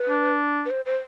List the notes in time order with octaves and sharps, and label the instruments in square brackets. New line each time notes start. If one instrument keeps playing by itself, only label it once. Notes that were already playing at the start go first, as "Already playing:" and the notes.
Already playing: [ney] B4
[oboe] D4
[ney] B4
C5
C5